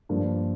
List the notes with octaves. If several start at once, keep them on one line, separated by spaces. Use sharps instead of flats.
G2 F3 A#3 D4